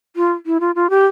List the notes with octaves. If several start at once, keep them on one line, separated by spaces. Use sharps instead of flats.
F4
E4
F4
F4
G4